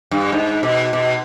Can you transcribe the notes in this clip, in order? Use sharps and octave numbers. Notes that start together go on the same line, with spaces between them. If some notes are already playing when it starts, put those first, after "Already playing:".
G2
G#2
B2
B2